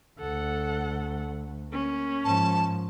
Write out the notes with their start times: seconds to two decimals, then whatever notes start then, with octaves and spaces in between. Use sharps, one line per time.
0.20 D2 A4 F#5
1.71 A#3 C#4
2.25 G#2 F3 A5